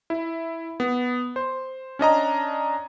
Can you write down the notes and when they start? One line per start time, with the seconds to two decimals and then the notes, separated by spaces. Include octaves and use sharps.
0.10 E4
0.80 B3
1.36 C5
1.99 C#4 D4 D#5 A#5